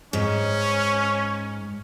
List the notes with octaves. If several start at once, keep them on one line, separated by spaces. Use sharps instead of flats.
G#2 C#4